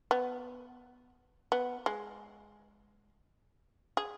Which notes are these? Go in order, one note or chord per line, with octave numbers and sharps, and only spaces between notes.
B3
B3
G#3
G#4